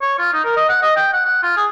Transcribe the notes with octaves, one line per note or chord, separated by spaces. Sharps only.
C#5
F4
D#4
A#4
D#5
F#5
D#5
G5
F#5
F#5
F4
G#4